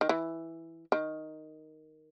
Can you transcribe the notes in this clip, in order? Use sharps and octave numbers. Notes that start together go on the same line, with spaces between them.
D#3
E3
D#3